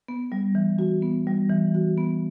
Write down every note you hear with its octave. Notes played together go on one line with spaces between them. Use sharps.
B3
G3
E3
F#4
B3
G3
E3
F#4
B3